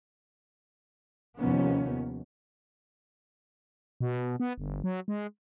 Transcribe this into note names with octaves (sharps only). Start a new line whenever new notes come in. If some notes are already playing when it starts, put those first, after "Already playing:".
D#2 C3 D#3 F3 B3 C#4
B2
B3
G1
F#3
G#3